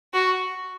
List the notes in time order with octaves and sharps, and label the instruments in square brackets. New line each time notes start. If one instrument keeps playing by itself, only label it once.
[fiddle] F#4